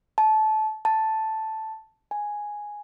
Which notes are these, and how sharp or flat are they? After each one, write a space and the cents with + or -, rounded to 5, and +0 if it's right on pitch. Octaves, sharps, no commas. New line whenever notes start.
A5 -20
A5 +0
G#5 +0